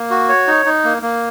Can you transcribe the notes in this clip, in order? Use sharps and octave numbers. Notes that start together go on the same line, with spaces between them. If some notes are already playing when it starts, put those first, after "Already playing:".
Already playing: A#3
F#4
C#5
D#4
D#4
A#3
A#3